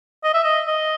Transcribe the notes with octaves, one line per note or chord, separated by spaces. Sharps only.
D#5
E5
D#5
D#5